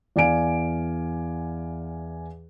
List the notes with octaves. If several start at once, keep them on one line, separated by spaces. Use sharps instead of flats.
E2 D5 F5 G#5 D7